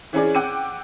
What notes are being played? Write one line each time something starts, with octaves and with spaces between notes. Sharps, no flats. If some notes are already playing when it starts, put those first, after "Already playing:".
E3 C#4 G#4 D5
F#5 G5 D6 E6 D#7